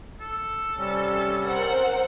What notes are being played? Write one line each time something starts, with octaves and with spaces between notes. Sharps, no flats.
A4
C3 G3 C#4
A#4 C5 F#5